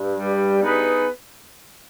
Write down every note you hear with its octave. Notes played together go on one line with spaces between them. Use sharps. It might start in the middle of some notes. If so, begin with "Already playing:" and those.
Already playing: G2
G3
B3 D#4 G#4 B4